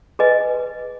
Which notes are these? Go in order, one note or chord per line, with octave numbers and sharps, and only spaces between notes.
G#4 B4 D#5 G#5